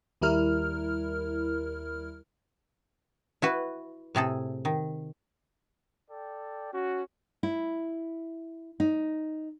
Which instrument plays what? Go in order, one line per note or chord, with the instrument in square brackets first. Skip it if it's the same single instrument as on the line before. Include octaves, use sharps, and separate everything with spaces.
[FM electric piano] D#2 G3 E4 A#4 F6
[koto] E4 F#4 B4
A2 C3 G#4 A4
D#3
[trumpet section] A4 D5 G5
C#4 F#4
[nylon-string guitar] E4
D#4